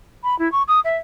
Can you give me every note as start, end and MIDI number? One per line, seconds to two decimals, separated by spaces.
0.23 0.38 83
0.39 0.50 64
0.52 0.62 85
0.68 0.80 87
0.84 0.96 76